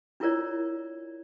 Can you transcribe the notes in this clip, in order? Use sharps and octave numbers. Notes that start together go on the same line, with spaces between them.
D4 E4 F4 A#4 C#5 D5